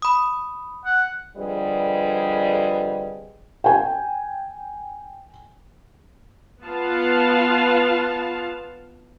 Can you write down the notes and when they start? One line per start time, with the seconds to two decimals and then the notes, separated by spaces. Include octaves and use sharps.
0.02 B5 D#6
0.85 F#5
1.36 F2 D3 G3 G#4 B4 D#5
3.64 G5 G#5
6.63 B3 F4 F5 A5